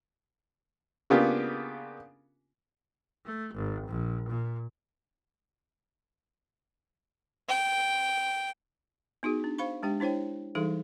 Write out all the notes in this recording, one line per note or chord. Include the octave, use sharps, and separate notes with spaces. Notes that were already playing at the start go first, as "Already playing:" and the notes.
C#3 A#3 B3 D4 F4 G4
A3
G#1
A#1
A#2
G5
B3 D#4 F#4 G#4
D4
C5 F5 B5 C#6
G#3 D4 G4 G5
D4 E4 C5 C#5 G5
E3 G3 D#4 G#4 A4 F5